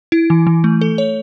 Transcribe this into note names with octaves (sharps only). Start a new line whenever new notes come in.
E4
E3
E3
A3
A4
C#5